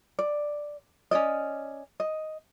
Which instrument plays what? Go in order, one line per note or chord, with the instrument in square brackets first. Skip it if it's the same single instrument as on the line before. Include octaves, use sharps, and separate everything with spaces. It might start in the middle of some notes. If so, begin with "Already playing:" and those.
[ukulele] D5
C#4 D4 D5 D#5
D#5